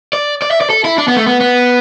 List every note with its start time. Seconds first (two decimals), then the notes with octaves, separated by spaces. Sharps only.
0.13 D5
0.42 D5
0.51 E5
0.61 D5
0.70 A4
0.85 E4
0.98 D4
1.08 B3
1.17 A3
1.27 B3
1.41 B3